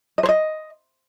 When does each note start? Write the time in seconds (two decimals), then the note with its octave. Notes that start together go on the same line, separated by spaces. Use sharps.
0.18 D#5
0.23 C5
0.29 D#5